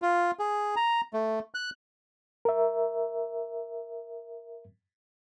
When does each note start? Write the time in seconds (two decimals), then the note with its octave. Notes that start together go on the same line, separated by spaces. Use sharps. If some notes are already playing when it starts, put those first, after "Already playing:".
0.02 F4
0.39 G#4
0.76 A#5
1.13 A3
1.54 F#6
2.45 A#4 E5